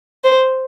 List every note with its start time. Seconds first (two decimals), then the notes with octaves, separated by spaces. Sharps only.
0.24 C5